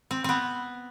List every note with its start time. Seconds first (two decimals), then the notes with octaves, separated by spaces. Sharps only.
0.11 C4
0.24 B3 C4